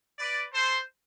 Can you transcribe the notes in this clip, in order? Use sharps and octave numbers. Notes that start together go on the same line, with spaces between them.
B4 D5
A4 C5